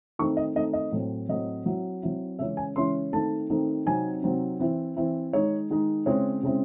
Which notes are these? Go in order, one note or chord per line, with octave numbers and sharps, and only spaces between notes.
D#3 A3 C4 D#4 C#6
D#5
D#3 A3 C4 D#4 D#5
D#5
A2 F#3 C4
A2 F#3 C4 D#5
F#3 C4 E4
F#3 C4 E4
C#3 E3 G#3 C#4 E4 E5
G#5
C#3 E3 G#3 C#4 E4 C6
D#3 A3 C4 D#4 A5
D#3 A3 C4 D#4
C3 F#3 C4 D#4 G#5
C3 F#3 C4 D#4
E3 C4 E4
E3 C4 E4
D#3 G#3 D#4 C#5
D#3 G#3 D#4
C#3 G#3 C4 E4 C#5
C#3 G#3 C4 E4